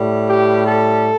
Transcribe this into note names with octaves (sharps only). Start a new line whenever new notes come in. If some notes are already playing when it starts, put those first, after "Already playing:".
Already playing: A2 G3
G4
A4